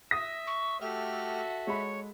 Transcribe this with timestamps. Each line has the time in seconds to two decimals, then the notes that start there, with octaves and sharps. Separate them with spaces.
0.11 E5 D#6 A#6
0.47 C#6
0.81 A3 F#4 G4 A4 E5 F6
1.67 G#3 C#5 B5